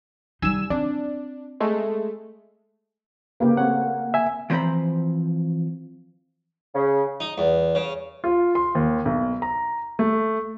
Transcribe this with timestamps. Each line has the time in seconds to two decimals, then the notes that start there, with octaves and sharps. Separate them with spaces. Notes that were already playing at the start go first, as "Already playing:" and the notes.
0.42 G3 D#4 G#5 E6 E7
0.70 C4 D4
1.60 G#3 A3
3.40 C#3 A#3 G4 B4
3.57 A3 C4 C#5 F#5
4.14 E5 G#5
4.50 E3 F3 C4 C5 A#5 B5
6.75 C#3
7.20 D#4
7.38 E2
7.75 C#3
8.24 F4
8.55 C6
8.75 D#2
9.05 B1
9.42 A#5
9.99 A3